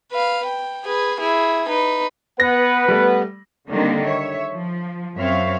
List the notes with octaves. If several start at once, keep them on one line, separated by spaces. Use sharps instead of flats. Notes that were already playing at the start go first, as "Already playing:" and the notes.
B4 F5
G5
G#4 B4
E4 G#4
D#4 B4
B3 B4 F#5 A#6
G3 A3 B3
D3 D#3 G3 A#3 C4
C#5 E5
F3
F#2 C4 C#5 E5 F5